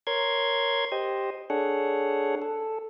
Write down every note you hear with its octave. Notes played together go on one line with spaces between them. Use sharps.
A#4 C#5 C6 G#6
G4 C5 D#5
D4 G#4 A4 C#5 F#5
A4